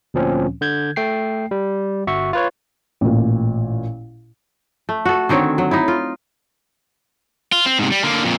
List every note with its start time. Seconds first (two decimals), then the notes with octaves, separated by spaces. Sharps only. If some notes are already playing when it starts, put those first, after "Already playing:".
0.14 D2 A#2 F3 C4 C#4
0.61 D3 G6 G#6
0.96 A3 G5 C7
1.51 G3
2.07 G1 F#4 E5 C#6
2.33 F4 B4 C#5
3.01 A1 A#2
4.89 A3
5.05 F#4 A4
5.29 D3 D#3 C4 C#5
5.58 F#3
5.71 D#4 E4
5.88 F4
7.52 F4
7.66 C4
7.79 G#2 C3
7.92 G3
8.04 D3 A#3
8.23 F2 A#2